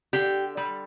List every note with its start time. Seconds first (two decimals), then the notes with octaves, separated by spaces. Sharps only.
0.13 D3 G4
0.57 G3